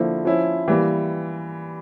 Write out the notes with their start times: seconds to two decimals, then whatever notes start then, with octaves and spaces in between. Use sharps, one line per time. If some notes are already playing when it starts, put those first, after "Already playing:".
Already playing: D3 F3 A#3 E4
0.25 F3 C#4 E4
0.68 E3 G3 A#3